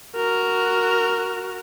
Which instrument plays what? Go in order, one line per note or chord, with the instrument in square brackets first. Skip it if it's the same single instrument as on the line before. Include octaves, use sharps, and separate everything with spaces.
[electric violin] F#4 A#4